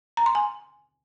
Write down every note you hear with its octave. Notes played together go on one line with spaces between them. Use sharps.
A#5
C6
G#5